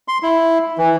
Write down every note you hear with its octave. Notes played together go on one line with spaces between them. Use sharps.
C6
E4
E3